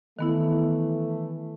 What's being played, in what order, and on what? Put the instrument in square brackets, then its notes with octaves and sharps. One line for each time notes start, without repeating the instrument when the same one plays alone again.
[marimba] D#3 B3 E4 [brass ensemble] E3 A3